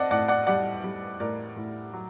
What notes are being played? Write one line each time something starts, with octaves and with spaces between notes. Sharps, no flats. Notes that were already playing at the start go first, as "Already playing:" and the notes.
Already playing: C4 D5 D#5 F#5 A5
A2 D5 F#5
D5 F#5
G3 D5 F#5
G3
A2 A#4 D5
A2
F#3